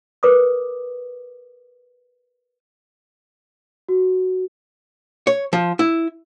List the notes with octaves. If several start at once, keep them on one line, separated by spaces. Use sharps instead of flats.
A#4 B4 D6 D#6
F#4
C#5
F3
E4